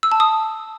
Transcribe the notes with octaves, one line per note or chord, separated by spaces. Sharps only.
E6
A5
D#6